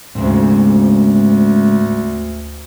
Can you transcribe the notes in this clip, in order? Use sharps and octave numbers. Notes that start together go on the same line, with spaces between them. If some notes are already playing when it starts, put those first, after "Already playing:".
D2 G#2 C#3 C4